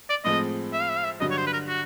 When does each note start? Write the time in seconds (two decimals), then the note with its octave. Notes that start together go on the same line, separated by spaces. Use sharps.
0.10 D5
0.24 A2 F3 G#3 C4 D#5
0.73 E5
0.81 F5
0.89 E5
0.97 F5
1.04 E5
1.20 G2 D3 F#3 D#5
1.31 C#5
1.37 C5
1.47 B4
1.53 A#4
1.68 F#4